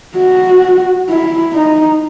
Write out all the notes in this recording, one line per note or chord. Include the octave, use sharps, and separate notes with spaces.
F#4
E4
D#4